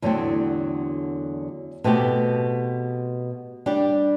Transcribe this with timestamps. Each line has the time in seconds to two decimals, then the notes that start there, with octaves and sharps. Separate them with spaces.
0.02 E2 D3 F#3 A3 C4
1.84 B2 A3 C4 G4
3.66 G3 D4 G4 D5